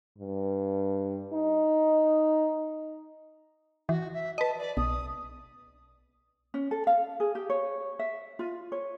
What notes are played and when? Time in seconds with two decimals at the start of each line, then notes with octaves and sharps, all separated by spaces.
0.18 G2
1.34 D#4
3.89 E3 F#4
4.14 E5
4.38 B4 D#5 A5
4.59 D5
4.77 B1 D#6
6.54 C#4
6.71 A4
6.87 F5
7.20 G#4
7.35 G4
7.50 C#5
7.99 E5
8.39 F4
8.72 C#5